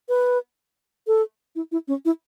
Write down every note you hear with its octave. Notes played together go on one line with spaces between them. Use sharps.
B4
A4
E4
E4
C#4
E4